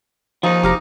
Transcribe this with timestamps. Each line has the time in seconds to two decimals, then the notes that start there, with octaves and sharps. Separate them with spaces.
0.43 D#2 F3 D#4 F4
0.63 F1 G4 F5 A#5